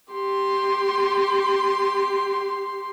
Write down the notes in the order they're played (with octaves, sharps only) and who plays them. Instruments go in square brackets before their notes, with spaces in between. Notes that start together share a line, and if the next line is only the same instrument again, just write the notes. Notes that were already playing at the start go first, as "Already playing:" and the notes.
[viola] G4 C6